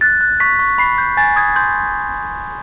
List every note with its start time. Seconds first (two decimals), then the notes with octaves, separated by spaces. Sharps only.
0.01 F#6 A6
0.21 F#6
0.40 C#6 B6
0.59 C#6
0.78 B5 C7
0.98 G6
1.17 G#5 A6
1.36 D#6 G#6
1.56 C6 G6